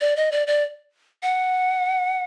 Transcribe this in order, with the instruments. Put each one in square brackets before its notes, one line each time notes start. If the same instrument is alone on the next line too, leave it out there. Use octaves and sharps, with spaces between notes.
[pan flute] D5
D#5
D5
D5
F#5